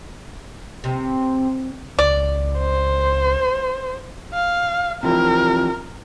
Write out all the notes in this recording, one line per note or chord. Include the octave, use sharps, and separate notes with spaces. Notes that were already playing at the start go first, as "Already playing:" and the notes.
C3
C#2 D5
C5
F5
C3 E3 F3 A#4